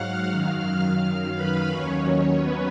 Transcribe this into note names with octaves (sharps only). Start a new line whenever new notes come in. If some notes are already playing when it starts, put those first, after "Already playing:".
Already playing: G#2 F#3 F5 F#5 F6 F#6
F#2 D#3 F#3
B4 B5
D#2 D#3 F#3 C#4 C#5
B3 B4